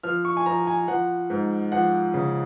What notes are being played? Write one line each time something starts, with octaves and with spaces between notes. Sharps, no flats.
F3 F6
C#6
G#5
F3 A#5
G#5
F3 F#5
G#2
F3 F#5
C#3